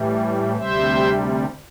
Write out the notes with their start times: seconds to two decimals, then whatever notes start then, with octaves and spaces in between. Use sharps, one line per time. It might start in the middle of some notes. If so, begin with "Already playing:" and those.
Already playing: A2 E3 G3
0.56 D2 C3 G3 C5 E5